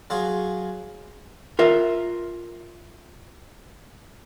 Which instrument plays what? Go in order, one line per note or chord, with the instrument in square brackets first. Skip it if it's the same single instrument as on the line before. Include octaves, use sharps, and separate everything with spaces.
[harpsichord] F#3 F4 F#4 G#4
[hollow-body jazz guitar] F4 A#4 E5